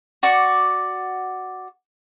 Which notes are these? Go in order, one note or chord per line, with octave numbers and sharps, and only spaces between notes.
F#4 D5 C#6